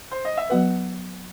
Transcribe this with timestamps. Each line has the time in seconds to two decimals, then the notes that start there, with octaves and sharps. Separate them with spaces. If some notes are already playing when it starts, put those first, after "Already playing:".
0.11 C5
0.25 D#5
0.38 E5
0.50 F#3 B3 F#4 B4 F#5